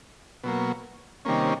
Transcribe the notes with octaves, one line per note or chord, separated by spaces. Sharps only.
B2 F#3 A#3
C3 D#3 G3 A#3 C#4